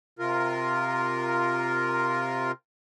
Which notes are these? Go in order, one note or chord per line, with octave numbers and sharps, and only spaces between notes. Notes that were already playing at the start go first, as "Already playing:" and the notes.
C3 F4 A#4